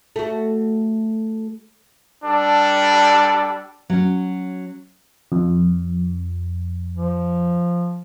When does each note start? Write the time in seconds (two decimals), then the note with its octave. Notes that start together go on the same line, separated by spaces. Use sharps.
0.16 A3 F#4
2.25 G3 D4 A4
3.90 F#3 C#4
5.32 F2
6.97 F3